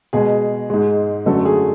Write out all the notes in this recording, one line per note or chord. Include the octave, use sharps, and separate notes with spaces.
B2 G#3 G#4
G#2 G#3
F#2 D3 F#3 A3 A4
G#4